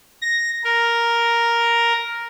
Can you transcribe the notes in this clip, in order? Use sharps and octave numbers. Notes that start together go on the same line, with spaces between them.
A#6
A#4